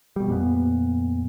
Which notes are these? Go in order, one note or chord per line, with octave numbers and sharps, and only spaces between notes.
B2 G3
F2 A#2 B3